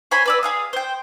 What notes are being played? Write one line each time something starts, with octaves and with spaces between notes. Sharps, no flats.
C5 C#5 G#5 B5
B4 D5 E6
G#4 F5 D#6
C5 G5